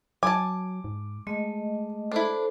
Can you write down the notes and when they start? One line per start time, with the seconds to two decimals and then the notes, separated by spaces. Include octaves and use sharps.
0.23 F#3 G#5 A5 D6
0.84 G#2
1.27 G#3 A3 D#5
2.12 D4 E4 A4 C5